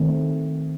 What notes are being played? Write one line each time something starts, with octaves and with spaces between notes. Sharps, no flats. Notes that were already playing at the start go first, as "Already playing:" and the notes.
Already playing: D#3 A3 C4